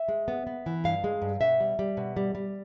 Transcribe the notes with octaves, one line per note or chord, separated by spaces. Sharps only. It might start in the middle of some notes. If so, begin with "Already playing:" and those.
Already playing: E5
G#3
B3
B3
E3
G2 F5
G#3
G2
B2 E5
G3
G3
B2
G3
G3